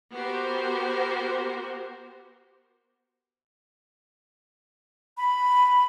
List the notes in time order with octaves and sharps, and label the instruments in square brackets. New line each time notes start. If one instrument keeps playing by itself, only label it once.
[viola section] B3 F#4 G4 A#4 C5
[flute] B5